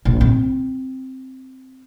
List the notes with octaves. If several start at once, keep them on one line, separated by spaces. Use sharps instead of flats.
A#1
C4